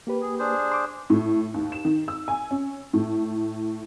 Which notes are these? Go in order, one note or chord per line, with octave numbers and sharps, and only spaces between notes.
A#3 G4 B4
G#4
D4 G#4 C5
C6 D6
A2
D#2
E7
D#3
E6
G#5
C#4
A2